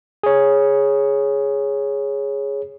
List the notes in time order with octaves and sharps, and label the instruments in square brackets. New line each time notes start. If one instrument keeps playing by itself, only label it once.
[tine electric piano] G#4 C#5